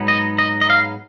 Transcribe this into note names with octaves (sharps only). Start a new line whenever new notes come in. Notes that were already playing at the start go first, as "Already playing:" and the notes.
Already playing: G#2 F#3 B3 D#4
D#5
D#5
D#5
F5